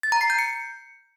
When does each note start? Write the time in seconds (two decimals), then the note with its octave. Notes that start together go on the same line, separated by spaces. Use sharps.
0.03 A6
0.12 A#5
0.21 C7
0.30 G6
0.39 C#7